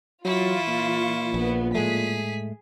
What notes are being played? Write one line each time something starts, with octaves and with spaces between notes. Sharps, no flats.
E3 F#3 E4 F4 C#6
A#2
A#1 F3 B3
A2 G#3 A3 G#4 B6